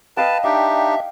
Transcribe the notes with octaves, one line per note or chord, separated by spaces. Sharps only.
B4 D#5 F5 G5 A5
D4 D#4 G4 E5